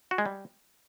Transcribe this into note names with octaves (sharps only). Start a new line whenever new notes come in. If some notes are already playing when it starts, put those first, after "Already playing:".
F#4
G#3
G3